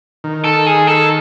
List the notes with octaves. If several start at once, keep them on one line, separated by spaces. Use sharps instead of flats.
D#3
A4
G#4
A4